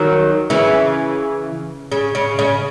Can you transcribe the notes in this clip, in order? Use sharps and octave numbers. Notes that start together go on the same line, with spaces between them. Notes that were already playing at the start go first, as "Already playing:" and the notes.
Already playing: D#3 F#3
C#3 E3
C#3
C#3
C#3